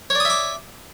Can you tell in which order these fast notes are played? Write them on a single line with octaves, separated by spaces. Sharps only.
C#5 D5 D#6 E5 D6